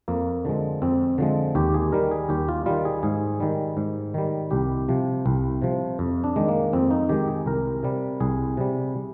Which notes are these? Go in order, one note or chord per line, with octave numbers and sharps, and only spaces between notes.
F2 A#3
D3 F3 G#3
F2 C4
D3 F3 G#3
D#2 G4
G#4
D#3 G3 A#4
G#4
D#2 G4
F4
D#3 G3 F4
G#4
G#2 G#4
D#3 G3
G#2
D#3 G3
C2 G4
C3 F3
C2
C3 F3
F2
D4
D#3 G#3
A#3
F2 C4
D#4
D#3 G#3 G4
G#4
C2 A#4
C3 G3
C2 G#4
C3 G3